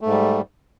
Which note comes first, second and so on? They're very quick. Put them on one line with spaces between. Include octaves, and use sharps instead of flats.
A3 G#2 G3